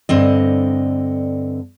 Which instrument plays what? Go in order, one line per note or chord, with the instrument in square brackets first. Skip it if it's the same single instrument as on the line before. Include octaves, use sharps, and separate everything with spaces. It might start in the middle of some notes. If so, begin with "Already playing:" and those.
[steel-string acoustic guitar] G2 D3 C4 D#5